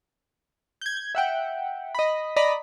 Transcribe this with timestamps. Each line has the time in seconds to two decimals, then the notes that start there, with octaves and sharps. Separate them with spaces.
0.81 G6 G#6
1.15 E5 F#5 G5
1.95 D#5 B5
2.36 D5 D#5 A#5 B5